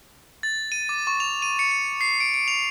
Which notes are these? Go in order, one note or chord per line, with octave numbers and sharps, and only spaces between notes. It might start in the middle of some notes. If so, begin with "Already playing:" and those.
A6
D#7
D6
C#6
F7
D#7
C#7
C#7
C7
D7
D7
F7